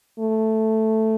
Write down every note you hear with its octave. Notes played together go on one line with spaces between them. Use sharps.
A3